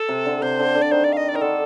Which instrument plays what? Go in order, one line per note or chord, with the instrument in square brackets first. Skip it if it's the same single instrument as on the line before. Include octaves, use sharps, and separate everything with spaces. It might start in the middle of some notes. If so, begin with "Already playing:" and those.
Already playing: [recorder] A4
[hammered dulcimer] C3
D3
[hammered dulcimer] C3 [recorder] C5
[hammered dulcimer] D3
D3
[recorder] D5
[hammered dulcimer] D#3 [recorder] C5
[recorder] D5
F5
D#5
D5
[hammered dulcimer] D#3 [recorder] A#4
[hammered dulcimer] D3 [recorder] A4